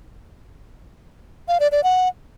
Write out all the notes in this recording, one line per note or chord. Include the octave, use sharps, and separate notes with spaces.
F5
D5
D5
F#5